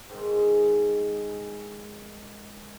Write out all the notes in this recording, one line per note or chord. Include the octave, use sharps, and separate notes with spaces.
G#2 D#3 G#3